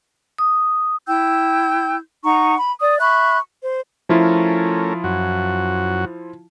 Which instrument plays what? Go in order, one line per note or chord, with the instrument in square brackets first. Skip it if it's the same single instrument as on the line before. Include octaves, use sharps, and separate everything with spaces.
[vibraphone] D#6
[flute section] E4 G5 E6 G6
D#4 F#5 A#5 C#6
B5
D5 D#6
E5 B5 C#6 F#6
C5
[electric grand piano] F3 E4 F4 [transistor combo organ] A3 C#4 A#4
[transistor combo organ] F#2 F#4